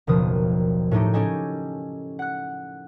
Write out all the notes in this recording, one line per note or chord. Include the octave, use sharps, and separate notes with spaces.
F#1 D#2 B2 F3 D#6
A2 A3 D#4 G4
C#4 G4 A4 D#5 G#5
F#5 F#6